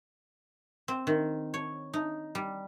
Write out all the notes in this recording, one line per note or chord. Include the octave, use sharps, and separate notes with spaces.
C4
D#3
C#5
D#4
G3